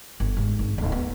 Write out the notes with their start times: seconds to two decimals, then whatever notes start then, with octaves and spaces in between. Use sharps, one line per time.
0.20 G1
0.37 G#2
0.59 G#1
0.78 D1
0.92 B3